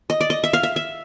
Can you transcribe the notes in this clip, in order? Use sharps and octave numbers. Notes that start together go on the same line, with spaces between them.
D#5
D5
D#5
E5
F5
E5
E5